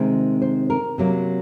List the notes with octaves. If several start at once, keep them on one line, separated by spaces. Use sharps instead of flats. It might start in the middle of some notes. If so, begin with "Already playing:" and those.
Already playing: C3 D#3 G#3 C4 C5
C5
A#4
C3 F#3 A#3